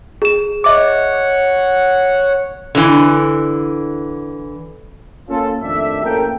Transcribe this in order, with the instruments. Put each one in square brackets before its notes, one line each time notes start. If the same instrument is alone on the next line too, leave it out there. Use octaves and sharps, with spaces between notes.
[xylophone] G#4 E7
[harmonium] C#5 F#5 [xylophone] D#5 E5 D6
[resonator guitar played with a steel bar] D3 E3
[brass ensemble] A#3 C#4 F4 A4
F2 D#3 A3 D4 G4 E5
A1 A#3 C#4 A4 A#4 G5